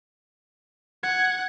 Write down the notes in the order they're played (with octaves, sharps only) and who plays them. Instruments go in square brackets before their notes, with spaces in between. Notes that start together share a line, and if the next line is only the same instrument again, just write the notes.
[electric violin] F#5 [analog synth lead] G#6